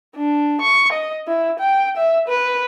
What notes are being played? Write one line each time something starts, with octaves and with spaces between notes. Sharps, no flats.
D4
C#6
D#5
E4
G5
E5
B4